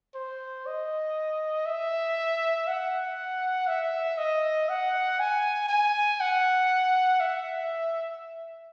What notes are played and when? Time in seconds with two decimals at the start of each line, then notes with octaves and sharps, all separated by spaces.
0.15 C5
0.66 D#5
1.66 E5
2.67 F#5
3.68 E5
4.18 D#5
4.69 F#5
5.20 G#5
5.69 G#5
6.20 F#5
7.20 E5